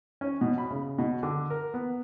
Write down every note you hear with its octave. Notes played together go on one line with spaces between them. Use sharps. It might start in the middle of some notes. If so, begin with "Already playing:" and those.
C#4
B2
B5
C#3
B2
D3
A#4
B3